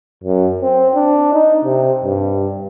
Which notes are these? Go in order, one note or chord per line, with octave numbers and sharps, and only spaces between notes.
F#2
C4
D4
D#4
C3
G2